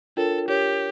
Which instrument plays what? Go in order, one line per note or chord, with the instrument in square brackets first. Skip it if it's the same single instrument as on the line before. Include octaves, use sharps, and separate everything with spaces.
[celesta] D4 F4 A#4 C#5 G5 [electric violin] A4
[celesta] D4 F4 A#4 C#5 [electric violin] G4